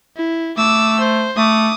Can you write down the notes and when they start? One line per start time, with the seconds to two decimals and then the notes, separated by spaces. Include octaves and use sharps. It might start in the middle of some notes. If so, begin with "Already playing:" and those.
0.17 E4
0.58 A3 D6 E6
1.00 C5
1.37 A3 D6 D#6